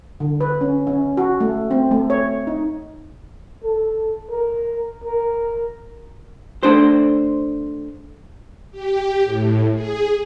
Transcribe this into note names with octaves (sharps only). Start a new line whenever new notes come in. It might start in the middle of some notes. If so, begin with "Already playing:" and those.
D3
B4
C#4
C#4
F#4
A3
C4
A3
C#5
D#4
A4
A#4
A#4
A3 D4 C5
G4
A2
G#4